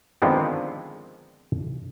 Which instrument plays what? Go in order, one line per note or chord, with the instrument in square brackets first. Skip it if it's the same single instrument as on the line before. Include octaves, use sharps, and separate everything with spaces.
[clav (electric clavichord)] D3 D#3 F3 G#3 B3 C4